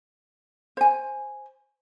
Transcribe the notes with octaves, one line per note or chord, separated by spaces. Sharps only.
C5 G#5